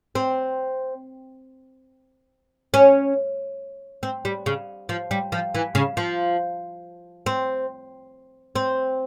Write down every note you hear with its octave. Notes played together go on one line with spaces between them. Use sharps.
C4
C#4
C4
G3
C#3
F3
G3
F3
E3
C#3
F3
C4
C4